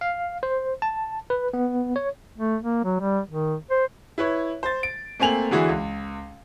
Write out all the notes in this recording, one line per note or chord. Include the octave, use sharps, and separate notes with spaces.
F5
C5
A5
B4
B3
C#5
A3
A#3
F#3
G3
D#3
C5
E4 B4 C#5
C5 A6
D7
A3 A#3 C4 G#5 F7 F#7
D3 E3 E4 F#4 G#4
C#2